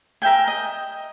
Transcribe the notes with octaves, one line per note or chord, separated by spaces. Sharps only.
A#4 E5 G5 G#5
D#5